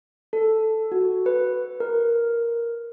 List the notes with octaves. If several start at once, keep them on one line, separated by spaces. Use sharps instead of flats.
A4
F#4
B4
A#4